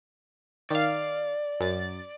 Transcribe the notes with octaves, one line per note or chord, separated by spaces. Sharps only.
D#3 D5 F5
F#2 A6